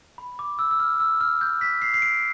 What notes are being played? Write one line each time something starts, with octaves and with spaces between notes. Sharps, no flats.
B5
D6
E6
E6
F6
E6
F6
G6
B6
C7
C7
D7